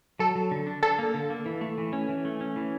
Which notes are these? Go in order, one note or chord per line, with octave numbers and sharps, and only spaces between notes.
F#3 A4
F#3
D3
D4
D4 A4
A#3
D3
A#3
E3
A3
E3
C#4
E3
A3
C#4
E3